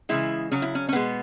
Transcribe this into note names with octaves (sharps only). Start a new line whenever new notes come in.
C#3 E3 G#3 E4
C#3 F#3 C#4
E4
C#4
C#4
B2 G#3 B3